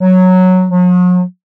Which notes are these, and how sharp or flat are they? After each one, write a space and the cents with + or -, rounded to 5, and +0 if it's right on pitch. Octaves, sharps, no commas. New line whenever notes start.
F#3 -5
F#3 -45